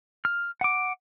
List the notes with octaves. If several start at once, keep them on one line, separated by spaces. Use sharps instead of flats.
F6
F#5 D6